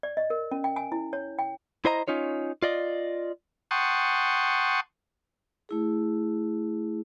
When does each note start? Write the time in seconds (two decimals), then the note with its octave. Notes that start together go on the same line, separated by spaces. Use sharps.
0.03 D5
0.17 D#5
0.30 A#4
0.51 C#4
0.64 G5
0.76 G#5
0.92 E4
1.13 C#5
1.39 G5
1.85 E4 C5 D#5 A#5
2.08 C#4 D#4 F4 C#5
2.63 F4 D5 D#5
3.71 F#5 G5 A5 C6 C#6 D#6
5.69 A3 E4 G#4